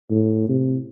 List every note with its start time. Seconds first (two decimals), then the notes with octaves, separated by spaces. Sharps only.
0.11 A2
0.49 C3